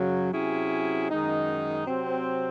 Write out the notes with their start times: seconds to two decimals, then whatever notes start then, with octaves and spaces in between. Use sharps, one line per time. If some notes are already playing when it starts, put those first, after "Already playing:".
Already playing: F#2 C#3 F#3
0.32 C3 F#3 C#4 E4 G#4
1.10 F#2 D#3 G#3 D#4
1.86 C3 F#3 C4